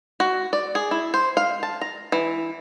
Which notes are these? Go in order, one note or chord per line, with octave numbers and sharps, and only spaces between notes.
F#4
D5
G#4
E4
C5
F5
A5
A#5
E3